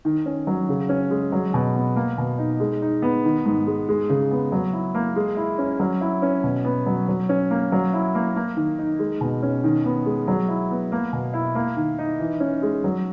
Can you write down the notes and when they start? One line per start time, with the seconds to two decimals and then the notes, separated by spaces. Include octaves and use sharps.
0.05 D#3
0.26 C#4
0.47 F#3
0.69 C#3
0.89 C#4
1.11 G#3
1.32 F#3
1.54 B2
1.75 B3
1.96 A#3
2.18 B2
2.39 D#4
2.60 G#3
2.82 D#4
3.02 B3
3.25 D#3
3.45 G#2
3.67 G#3
3.89 G#3
4.09 C#3
4.31 B3
4.52 F#3
4.73 E4
4.95 A#3
5.16 G#3
5.37 E4
5.58 C#4
5.79 F#3
6.01 E4
6.22 C#4
6.43 B2
6.65 B3
6.86 F#3
7.08 F#3
7.29 C#4
7.51 A#3
7.72 F#3
7.93 E4
8.15 A#3
8.36 A#3
8.56 D#3
8.78 D#4
8.99 G#3
9.21 B2
9.43 C#4
9.64 D#3
9.85 B3
10.06 G#3
10.28 F#3
10.49 E4
10.70 B3
10.92 A#3
11.13 B2
11.34 E4
11.55 A#3
11.77 D#3
11.99 D#4
12.20 E3
12.40 C#4
12.62 G#3
12.84 F#3